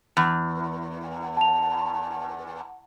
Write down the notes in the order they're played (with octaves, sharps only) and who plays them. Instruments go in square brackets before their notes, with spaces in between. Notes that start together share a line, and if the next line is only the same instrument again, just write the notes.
[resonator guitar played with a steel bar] E2
[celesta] A5 F7